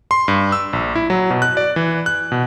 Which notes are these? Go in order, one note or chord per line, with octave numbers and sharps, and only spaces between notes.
C6
G2
E6
A#1
E4
F#3
B2
F#6
D5
E3
F#6
B2